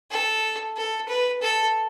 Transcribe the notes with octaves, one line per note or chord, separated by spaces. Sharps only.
A4
A4
B4
A4